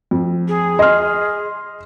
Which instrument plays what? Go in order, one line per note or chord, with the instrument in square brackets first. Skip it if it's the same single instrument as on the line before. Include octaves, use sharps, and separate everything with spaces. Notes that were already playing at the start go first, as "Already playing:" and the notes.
[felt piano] F2
[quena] G#4
[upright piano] D#5 [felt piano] C6 F6